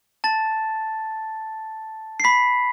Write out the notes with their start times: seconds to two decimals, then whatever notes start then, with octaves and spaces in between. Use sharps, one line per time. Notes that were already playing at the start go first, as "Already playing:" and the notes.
0.24 A5 A6
2.20 C7
2.24 B5 B6